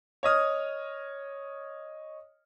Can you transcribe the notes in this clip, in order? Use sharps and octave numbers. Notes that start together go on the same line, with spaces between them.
C#5 D#5 D#6 F6